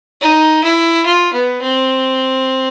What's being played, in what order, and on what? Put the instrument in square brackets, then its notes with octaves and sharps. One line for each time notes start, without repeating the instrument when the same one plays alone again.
[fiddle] D#4
E4
F4
B3
C4